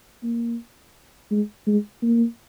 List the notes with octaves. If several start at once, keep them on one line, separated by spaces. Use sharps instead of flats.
A#3
G#3
G#3
A#3